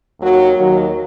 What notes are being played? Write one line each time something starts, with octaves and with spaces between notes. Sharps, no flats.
D#2 D#3 F#3
D#2 D#3 F#3